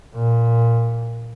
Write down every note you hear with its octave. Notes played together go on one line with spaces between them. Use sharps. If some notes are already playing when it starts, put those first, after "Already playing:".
A#2